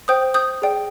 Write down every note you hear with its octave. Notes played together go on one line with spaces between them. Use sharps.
C5 G5 D#6 G6
D#6 G6
G#4 D5 G5